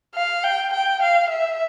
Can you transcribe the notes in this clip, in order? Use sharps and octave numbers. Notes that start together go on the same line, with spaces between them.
F5
G5
G5
F5
E5